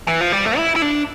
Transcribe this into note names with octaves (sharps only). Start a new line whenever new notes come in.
E3
F3
G3
A3
E4
E4
D4